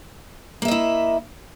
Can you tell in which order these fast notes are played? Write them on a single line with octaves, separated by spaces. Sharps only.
A#3 E5 D#5 E4